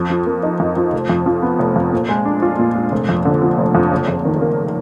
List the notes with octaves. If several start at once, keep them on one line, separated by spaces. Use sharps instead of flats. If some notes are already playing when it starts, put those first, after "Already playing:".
Already playing: F2
F3
A#3
D#4
F2
F3
F1
F2
F3
B3
F1
F2
A#2
G#3
D4
F4
A#2
G#3
F1
F2
D3
F3
F1
F2
F#1
F2
D#3
A#3